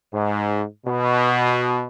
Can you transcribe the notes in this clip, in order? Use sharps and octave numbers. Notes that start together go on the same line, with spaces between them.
G#2
B2